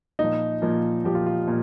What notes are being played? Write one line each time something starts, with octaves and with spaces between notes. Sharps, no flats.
A#2 F3 D#4
A#2 F3
A#2 F3 G4
F4
F4
A#2